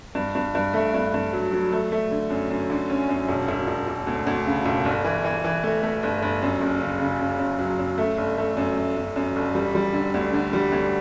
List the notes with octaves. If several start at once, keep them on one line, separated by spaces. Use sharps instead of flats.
G2
G2
G2
A3
G2
G2
F#3
F#3
A3
A3
D3
F#2
F#2
D3
C#4
F#2
E1
E1
E1
E1
D2
D2
C#3
E1
G1
E3
E3
E3
A3
A3
G1
G1
F#2
F#1
C#3
C#3
C#3
F#2
F#3
F#2
A3
G1
A3
F#2
A3
F#2
F#2
G1
G3
G3
D3
D2
D3
G3
D2